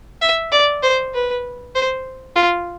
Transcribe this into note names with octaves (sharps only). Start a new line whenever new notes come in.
E5
D5
C5
B4
C5
F4